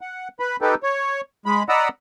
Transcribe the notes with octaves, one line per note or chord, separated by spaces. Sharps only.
F#5
B4 B5
D#4 G4 A4 B4
C#5
G#3 B5
D5 D#5 F#5 A#5 B5 E6